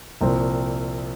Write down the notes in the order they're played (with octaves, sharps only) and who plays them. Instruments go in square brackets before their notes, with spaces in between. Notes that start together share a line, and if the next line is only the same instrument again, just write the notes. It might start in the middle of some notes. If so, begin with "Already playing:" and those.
[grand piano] C2 A#2 F3 C4